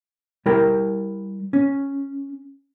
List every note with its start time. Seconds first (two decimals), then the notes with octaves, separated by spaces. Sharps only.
0.46 G3 E4 A#4 G5
1.53 C#4